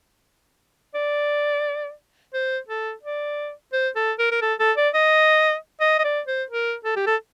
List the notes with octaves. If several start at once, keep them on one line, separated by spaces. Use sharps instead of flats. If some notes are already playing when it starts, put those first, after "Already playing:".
D5
C5
A4
D5
C5
A4
A#4
A#4
A4
A4
D5
D#5
D#5
D#5
D5
C5
A#4
A4
G4
A4